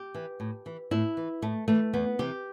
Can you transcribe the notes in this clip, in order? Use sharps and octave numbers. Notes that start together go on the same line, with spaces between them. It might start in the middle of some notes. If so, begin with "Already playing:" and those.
Already playing: G4
E3
A2
E3
A2 E4
E3
A2 A3
E3 A3
E2 B3
C3 E3 G4